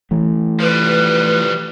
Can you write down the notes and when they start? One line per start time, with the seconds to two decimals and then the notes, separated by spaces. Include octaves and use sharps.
0.11 E3 A3
0.60 F3 G3 B4